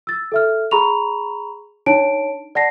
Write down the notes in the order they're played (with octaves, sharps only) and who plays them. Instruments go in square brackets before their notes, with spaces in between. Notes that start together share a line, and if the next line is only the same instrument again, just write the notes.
[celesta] E6 A6
A4 E5 F6
G#4 A#5 B5 C#6 F7
D4 D#4 C#5 A5 D7
D5 F#5 A5 A#6 C7